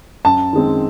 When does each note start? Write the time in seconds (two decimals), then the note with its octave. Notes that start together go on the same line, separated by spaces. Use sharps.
0.25 F#2 A5
0.53 D#3 G#3 C4